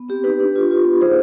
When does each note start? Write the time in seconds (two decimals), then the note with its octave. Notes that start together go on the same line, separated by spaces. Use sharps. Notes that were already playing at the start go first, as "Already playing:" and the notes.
Already playing: B3
0.09 C4 G4
0.24 D#4 G4 B4
0.40 D4
0.56 F4
0.71 F4
0.85 B3
1.00 D#4 G#4 C5